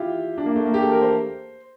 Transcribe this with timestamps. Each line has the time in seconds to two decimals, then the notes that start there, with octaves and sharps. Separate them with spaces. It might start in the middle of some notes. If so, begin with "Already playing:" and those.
Already playing: E4 F4 G4
0.38 D4
0.46 A#3
0.56 A3
0.65 A#3
0.74 G4
0.82 A4
0.92 A#4
1.02 C5